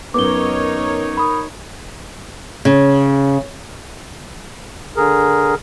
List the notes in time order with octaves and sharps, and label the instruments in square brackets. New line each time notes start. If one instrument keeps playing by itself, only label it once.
[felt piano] F#2 B3 [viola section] D#4 A#4 C#5 [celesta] D6 G7
[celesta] B5 D#6
[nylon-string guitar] C#3
[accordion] D3 G#4 A#4